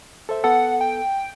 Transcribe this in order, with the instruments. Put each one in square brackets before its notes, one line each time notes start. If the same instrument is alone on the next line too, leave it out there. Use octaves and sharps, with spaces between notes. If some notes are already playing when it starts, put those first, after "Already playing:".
[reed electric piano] A4 C5 E5
[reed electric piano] B3 A4 [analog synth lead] F#5
[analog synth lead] G5